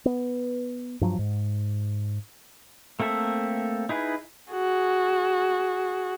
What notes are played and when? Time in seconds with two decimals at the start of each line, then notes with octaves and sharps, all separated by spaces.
0.05 B3
1.01 G2 F3 F#3
1.19 G#2
3.00 A3 A#3 C4 A4 E5
3.89 D#4 E4 G#4 B4
4.51 F#4 G#4